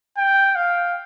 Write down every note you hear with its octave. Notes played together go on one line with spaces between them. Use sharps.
G5
F5